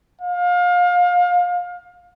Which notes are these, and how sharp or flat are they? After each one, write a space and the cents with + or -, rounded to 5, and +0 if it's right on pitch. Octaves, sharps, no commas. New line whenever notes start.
F5 +30